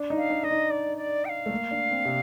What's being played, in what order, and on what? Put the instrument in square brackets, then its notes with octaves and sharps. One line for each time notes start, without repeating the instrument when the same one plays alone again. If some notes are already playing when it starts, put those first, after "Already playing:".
Already playing: [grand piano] D4
D#4
[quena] F5
[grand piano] D4
[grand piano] D4 [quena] D#5
[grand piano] D#4
[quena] D5
D5
G5
F5
[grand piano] A3
A#3
D4
C4
C3